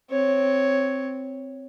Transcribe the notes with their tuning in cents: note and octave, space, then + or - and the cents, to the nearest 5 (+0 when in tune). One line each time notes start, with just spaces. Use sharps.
C4 +0 C#5 +0